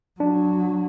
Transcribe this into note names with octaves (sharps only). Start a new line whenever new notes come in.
F#3 D4